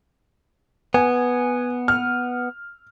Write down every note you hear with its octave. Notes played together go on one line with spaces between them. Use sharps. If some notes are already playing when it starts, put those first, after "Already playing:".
B3 G#5
F6